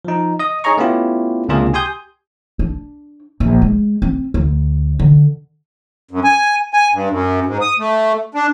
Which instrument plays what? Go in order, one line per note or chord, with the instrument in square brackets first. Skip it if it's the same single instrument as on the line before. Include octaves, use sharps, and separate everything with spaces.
[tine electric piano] F3 D#4
D#5 D#6
D#4 G#4 C#5 D#5 A#5 C#6
A3 B3 C#4 E4 F4 G4
C#2 C3 A#3 D4 F4 G#4
G4 G#5 C6 D#6 G6
[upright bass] D4
A#1
G#3
C4
D2
D3
[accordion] F#2
G#5
G#5
G2
F#2
G#2
D#6
A3
D4